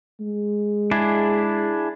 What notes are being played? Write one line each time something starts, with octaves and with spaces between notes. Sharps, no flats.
G#3
D4 E4 G#4